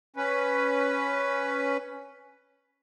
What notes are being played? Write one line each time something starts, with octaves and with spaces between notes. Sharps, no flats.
C#4 B4